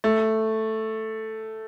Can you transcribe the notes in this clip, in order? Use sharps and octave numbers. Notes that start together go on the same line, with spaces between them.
A3